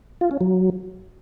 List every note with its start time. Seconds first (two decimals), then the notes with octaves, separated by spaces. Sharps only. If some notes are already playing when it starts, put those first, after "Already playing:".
0.21 F4
0.31 C#4
0.41 F#3